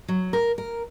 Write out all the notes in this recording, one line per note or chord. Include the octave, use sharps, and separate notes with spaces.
F#3
A#4
A#4